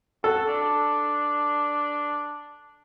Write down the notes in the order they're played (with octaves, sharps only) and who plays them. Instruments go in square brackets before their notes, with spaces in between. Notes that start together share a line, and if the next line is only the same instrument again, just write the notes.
[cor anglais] F#4 [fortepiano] A4
[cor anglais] D4